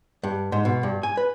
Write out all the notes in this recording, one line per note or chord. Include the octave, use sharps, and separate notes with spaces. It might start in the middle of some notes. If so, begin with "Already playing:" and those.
G2
G#2
B2
G2
G#5
B4